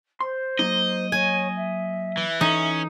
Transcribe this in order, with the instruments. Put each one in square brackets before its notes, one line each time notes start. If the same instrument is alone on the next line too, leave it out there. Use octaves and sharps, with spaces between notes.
[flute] C5 [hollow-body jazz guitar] C6
[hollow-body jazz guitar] F#3 A#3 D#4 [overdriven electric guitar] D#5
[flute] C#5 [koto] G#5
[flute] E5
[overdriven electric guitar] E3
[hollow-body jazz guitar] E3 A4 [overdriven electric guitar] C#4 [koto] D#4